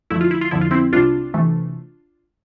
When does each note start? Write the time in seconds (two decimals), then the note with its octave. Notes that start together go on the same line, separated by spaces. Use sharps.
0.10 F2 D3 F3 A3 E4
0.21 F4
0.31 E4
0.41 F4
0.51 F2 D3 F3 E4
0.61 F4
0.71 C4 E4
0.93 C2 C3 G3 D4 F4
1.34 C3 E3 A3